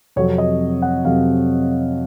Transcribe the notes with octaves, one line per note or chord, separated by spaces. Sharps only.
F2 C3 F#3 C#5
D#5
F#5
F2 C3 F#3 F5